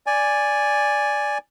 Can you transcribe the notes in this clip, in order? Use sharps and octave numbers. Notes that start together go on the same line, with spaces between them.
D5 G#5